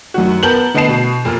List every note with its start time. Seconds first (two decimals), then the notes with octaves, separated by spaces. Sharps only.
0.14 F#2 D#3 F#4
0.43 B3 A#4 A5 G6 F#7
0.74 D3 B3 D#5 A5 C7 E7
0.88 B2
1.25 F1 A#2